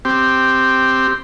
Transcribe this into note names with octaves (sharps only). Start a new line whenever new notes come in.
C4 G4